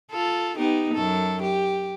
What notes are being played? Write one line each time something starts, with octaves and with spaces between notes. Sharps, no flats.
F4 A4
B3 D#4 G4
F#2 A4
G4